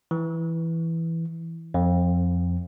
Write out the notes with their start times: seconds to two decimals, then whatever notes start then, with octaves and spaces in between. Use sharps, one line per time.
0.11 E3
1.74 F2